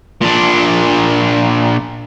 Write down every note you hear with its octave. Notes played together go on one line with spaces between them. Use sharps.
A#2 D4